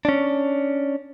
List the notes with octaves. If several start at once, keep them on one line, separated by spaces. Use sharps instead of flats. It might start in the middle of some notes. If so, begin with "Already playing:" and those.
C#4 D4